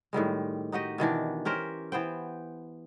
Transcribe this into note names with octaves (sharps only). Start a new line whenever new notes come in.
A2 D#3 G3 G#3
D#4 F#4 G4 D#5
B2 D#3 E3 D4
C#4 G4 A#4 C5
E3 B3 C5 G5